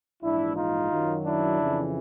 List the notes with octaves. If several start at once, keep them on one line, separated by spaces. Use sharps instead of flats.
A#1 G#2 E3 D4 E4
D#4 F4
F#2 D#3 F#3
D4 E4
F2 C#3 E3